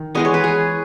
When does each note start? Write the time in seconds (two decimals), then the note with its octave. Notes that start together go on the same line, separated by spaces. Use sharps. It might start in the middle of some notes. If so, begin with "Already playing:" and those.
Already playing: D#3
0.15 E3 G#3 B3 D#5
0.25 C#5
0.34 B4
0.44 G#4